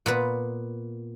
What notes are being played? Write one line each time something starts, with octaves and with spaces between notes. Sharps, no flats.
A#2 B3 B4